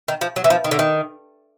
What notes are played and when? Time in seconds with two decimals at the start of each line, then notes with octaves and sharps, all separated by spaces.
0.08 D#3
0.21 F3
0.36 F#3
0.44 E3
0.50 F3
0.64 D#3
0.71 D3
0.79 D#3